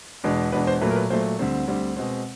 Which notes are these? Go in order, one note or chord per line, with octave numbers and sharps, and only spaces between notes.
E2 B2 G#3 B3 D4
E2 B2 G#3 B3 D4 B4
C5
A#2 F#3 A3 B4
A#4
B4
A#2 F#3 A3 C5
D2 D3 G3 C4
D2 D3 G3 C4
B2 G#3 C4